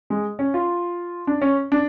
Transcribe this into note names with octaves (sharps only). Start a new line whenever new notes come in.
G#3
C#4
F4
D4
C#4
D4